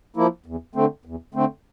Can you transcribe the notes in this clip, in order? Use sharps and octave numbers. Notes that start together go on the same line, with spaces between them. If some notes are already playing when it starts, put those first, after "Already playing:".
F3 A#3 E4
E2
D3 A3 C4
E2
D3 A3 C4